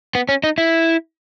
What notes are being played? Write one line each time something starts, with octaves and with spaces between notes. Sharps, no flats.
B3
C#4
D#4
E4